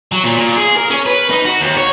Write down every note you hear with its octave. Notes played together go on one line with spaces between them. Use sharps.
F#3
A#2
A#2
G#4
A#4
C#4
B4
D#4
F#4
D#2
C#5